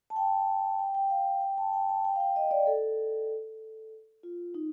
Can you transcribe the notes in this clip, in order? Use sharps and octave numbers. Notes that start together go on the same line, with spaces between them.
A5
G5
G5
G5
F5
G5
A5
G5
A5
G5
F5
G5
D#5
D5
A4
F4
D#4